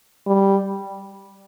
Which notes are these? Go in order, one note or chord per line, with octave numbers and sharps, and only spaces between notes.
G3